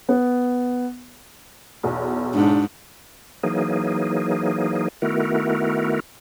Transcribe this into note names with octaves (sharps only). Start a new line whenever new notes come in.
B3
B1 E2
G#2 D4
E3 F#3 A#3 D#4 G#4
D#3 A3 B3 E4 F#4 A#4